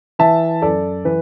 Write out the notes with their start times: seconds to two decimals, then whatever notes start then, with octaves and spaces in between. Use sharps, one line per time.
0.19 E3 E5 A5
0.62 F#2 A4 D5
1.05 E3 B4